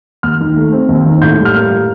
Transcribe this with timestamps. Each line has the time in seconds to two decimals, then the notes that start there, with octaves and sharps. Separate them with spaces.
0.23 D#2 F6
0.40 D#3
0.56 A3
0.72 C4
0.89 D#2
1.05 D#3
1.22 A2 G6
1.38 G3
1.45 F6
1.54 A#3
1.70 A2